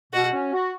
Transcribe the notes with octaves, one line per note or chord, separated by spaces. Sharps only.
B2 F#4
C#4
F#4